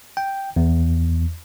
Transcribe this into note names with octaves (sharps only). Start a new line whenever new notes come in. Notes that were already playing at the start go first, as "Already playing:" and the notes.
G5
E2